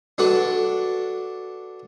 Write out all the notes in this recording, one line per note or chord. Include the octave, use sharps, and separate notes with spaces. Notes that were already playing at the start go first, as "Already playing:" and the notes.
D4 F#4 A4 B4